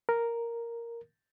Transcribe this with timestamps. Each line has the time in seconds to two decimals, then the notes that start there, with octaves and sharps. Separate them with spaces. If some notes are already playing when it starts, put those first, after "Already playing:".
0.09 A#4